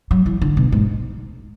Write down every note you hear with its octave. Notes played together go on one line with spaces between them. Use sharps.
F#3
E3
D3
B2
G#2